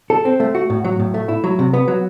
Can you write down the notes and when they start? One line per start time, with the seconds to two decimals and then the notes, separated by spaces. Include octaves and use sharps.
0.10 A4
0.25 C4
0.40 A3
0.55 F#4
0.70 A2
0.84 F#3
0.99 A2
1.14 A3
1.28 E4
1.44 F#3
1.59 C3
1.73 B3
1.88 F#3